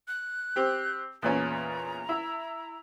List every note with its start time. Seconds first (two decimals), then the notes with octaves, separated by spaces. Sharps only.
0.08 F#6
0.56 C4 G4
1.22 E2 A#2 C#4 A#5
2.09 E4